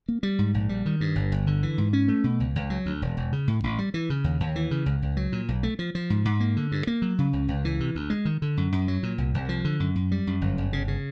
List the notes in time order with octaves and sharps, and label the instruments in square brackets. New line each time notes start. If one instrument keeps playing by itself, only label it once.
[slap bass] A#3
G3
G#2
A#1
G3
D#3
G2
G1
G1
D3
E3
G#2
C#4
A3
B2
C#2
C#2
F#3
D2
E1
E1
C#3
A2
A1
G3
E3
C#3
D#2
D#2
E3
C#3
C#2
C#2
F#3
A#2
B1
A3
F3
F3
G#2
G#2
A#3
D3
G2
A#3
F#3
C#3
C#2
C#2
E3
C3
D2
G#3
D#3
D3
F#2
F#2
F#3
A#2
C2
C2
F3
D3
F#2
F#2
G3
F#2
G1
G1
C#3
C#3